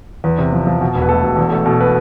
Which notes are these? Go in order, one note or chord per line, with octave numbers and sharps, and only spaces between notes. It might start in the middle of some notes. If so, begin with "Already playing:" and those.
E2 B4
C3
F3
F3
B2
E1
B4
A3 A4
E1
E2
A3
B2 A4
B4